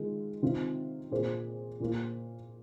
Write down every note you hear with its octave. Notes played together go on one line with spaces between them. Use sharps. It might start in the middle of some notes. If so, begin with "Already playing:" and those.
Already playing: D#3 G#3 F4
C3 D#3 C4 F4
A#2 A#3 G#4 C5
A#2 A#3 F4